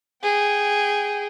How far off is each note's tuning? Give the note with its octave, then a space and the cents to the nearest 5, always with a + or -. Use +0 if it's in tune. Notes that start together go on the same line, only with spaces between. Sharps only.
G#4 -10 G5 -15